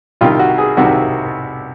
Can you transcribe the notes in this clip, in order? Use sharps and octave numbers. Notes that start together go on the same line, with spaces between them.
C2 C3 D#3 F4
F#4
G#4
C2 C3 D#3 F#4